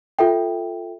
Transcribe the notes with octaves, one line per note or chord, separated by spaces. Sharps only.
F4 A4 E5 G5